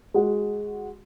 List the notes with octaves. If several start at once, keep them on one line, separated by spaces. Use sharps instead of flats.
G#3 F#4